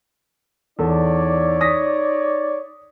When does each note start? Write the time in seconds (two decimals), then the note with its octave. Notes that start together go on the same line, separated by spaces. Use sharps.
0.79 E2 D#4 A4 C#5 D5
1.61 D#6 A#6 B6